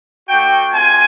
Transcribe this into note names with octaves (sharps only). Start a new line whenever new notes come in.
A3 D4 F#4 G5
G#3 C4 F4 G#5